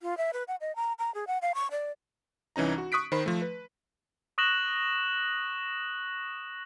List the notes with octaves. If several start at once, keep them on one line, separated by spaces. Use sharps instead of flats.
F4
E5
B4
F#5
D#5
A#5
A#5
G#4
F#5
F5
C#6
D5
C2 E3 C#4 D#4 A#5
F#4
C#6 D#6 F#6 B6 D7
D#3 C5 B5
F3 A3
B4
C#6 D#6 F#6 A#6 E7 F#7